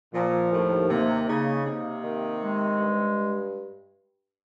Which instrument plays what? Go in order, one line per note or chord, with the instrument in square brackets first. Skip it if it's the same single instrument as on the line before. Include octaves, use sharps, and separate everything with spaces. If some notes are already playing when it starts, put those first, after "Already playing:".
[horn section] A#2 [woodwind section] F3
[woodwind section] D#2 [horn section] A2
[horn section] C3 [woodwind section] A#3
[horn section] C#3 [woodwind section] D#4
[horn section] C3 [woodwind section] A#3
[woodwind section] D#3
G#3
G2